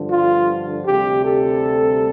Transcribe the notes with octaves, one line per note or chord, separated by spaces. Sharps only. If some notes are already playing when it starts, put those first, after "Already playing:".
Already playing: G2 D3 F3
F4
D2 C3 G3 G4
A4